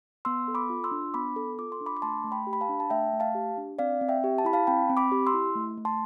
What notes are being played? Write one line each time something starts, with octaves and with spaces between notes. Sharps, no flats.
B3 C6 E6
A4
B5 D6
F4
C6 E6
D4
B3 B5 D6
A4
F4 D6
C6
D4
B5 D6
D6
A3 A5 C6
A3
G5 B5
G4
B5
F5 A5
D4
A5
A3 E5 G5
A3
F5 A5
G4
D4
C4 D5 F5
C4
E5 G5
G4
A5
E4 B5
F5 A5
C4 G5 B5
C4
B5 D6
G4
C6 E6
E4
A3
A3
A5 C6